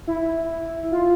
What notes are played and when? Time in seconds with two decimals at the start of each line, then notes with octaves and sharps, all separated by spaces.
0.07 E4
0.92 F4